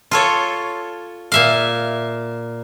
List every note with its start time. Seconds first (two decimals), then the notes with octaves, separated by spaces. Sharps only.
0.11 F4 A4 C#5
1.32 A#2 E5 F5